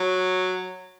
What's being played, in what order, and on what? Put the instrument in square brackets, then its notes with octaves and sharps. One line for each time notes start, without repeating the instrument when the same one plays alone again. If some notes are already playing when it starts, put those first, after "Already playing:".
Already playing: [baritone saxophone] F#3